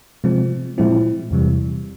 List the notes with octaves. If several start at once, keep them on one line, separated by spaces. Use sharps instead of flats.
C3 F3 G#3 C4
A#2 F3 G#3 C4 E4
E2 C3 E3 G3